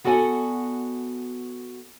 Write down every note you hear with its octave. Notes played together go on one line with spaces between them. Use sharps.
B3 F#4 A4 D5 G5 G#5